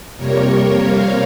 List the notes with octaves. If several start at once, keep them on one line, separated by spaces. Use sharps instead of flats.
F2 C3 G3 A#3 A#4 C#5
C#5 F5